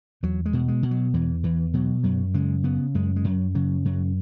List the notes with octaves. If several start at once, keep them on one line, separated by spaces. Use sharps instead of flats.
E2 F#3
G#3
B2
G#3
B2
F#3
E2 E3
E2 E3
B2 F#3
F#2 F#3
C#3 G#3
C#3 B3
F#2 G#3
G#3
F#2 F#3
C#3 F#3
F#2 F#3